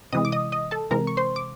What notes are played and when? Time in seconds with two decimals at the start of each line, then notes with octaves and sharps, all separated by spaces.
0.13 C3 E3 G#3 D#5 D#6
0.25 D6
0.32 D#5 D#6
0.52 D#5 D#6
0.71 A4 A5
0.91 C3 E3 G#3 A#4 A#5
1.07 C#6
1.17 C5 C6
1.36 D6